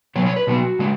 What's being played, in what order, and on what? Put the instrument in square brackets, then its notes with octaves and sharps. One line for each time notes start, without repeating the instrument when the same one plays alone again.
[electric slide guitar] B2 F#3 B3 C#5
C#5
B4
B2 F#3 B3 F#4
C#3 G#3